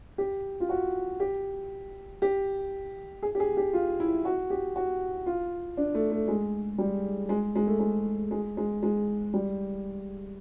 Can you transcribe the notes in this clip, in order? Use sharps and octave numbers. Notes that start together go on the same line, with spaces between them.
G4
F4
F#4
G4
G4
G#4
G4
G#4
G4
F4
E4
F#4
G4
F#4
F4
D4
A3
A3
G#3
G3
G#3
G#3
A3
G#3
G#3
G#3
G#3
G3